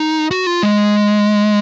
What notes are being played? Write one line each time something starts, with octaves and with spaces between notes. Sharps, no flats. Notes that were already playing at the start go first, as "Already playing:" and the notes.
Already playing: D#4
F#4
F4
G#3